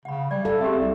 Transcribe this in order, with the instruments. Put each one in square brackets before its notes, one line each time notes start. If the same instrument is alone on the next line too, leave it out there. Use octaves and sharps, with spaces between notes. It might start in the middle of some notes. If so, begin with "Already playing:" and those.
[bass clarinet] C#3 [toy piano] F#5 B5
[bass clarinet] G3 [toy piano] D5 G5
[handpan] A4 [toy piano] F5
[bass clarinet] C4 [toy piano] G4 G#4 E5
[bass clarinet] C2